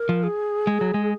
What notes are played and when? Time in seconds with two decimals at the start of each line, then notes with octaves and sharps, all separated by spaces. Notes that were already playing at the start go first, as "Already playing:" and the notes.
Already playing: A#4
0.09 F3
0.23 G#4
0.67 G#3
0.81 F#3
0.94 G#3